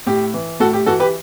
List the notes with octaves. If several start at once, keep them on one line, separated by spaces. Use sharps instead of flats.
A2 G4
E3
A2 F#4 A4
G4
E3 F#4 A4
G4 B4